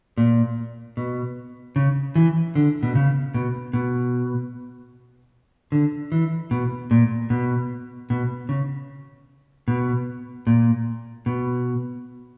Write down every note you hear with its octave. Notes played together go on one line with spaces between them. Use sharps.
A#2
B2
C#3
E3
D3
B2
C#3
B2
B2
D3
E3
B2
A#2
B2
B2
C#3
B2
A#2
B2